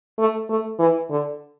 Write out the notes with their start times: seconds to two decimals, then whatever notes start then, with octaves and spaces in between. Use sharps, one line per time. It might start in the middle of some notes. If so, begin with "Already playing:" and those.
0.19 A3
0.50 A3
0.79 E3
1.10 D3